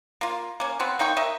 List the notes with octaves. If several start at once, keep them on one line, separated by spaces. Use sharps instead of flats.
A#3 F4
A#3 C#4
B3 C4 F#4
A#3 D#4 G5 C#6
A#4 D#5 E5